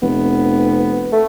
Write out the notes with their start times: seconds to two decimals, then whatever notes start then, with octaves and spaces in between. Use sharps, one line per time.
0.02 F1 B3
1.12 A3